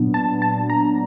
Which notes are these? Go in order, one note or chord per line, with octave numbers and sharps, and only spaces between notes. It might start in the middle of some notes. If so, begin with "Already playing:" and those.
Already playing: A#2 F#3 B3 D4
A5
A5
A#5